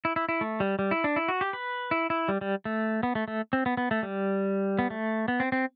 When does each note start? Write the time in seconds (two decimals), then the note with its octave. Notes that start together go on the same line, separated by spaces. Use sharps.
0.05 E4
0.16 E4
0.29 E4
0.41 A3
0.60 G3
0.79 G3
0.91 E4
1.04 D4
1.16 E4
1.28 F#4
1.41 G4
1.53 B4
1.91 E4
2.10 E4
2.28 G3
2.41 G3
2.65 A3
3.03 B3
3.15 A3
3.28 A3
3.53 C4
3.66 B3
3.77 B3
3.91 A3
4.03 G3
4.79 B3
4.90 A3
5.28 B3
5.40 C4
5.52 C4